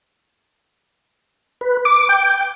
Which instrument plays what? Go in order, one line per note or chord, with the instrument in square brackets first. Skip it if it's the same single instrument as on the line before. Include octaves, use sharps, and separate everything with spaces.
[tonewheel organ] B4
D6
G5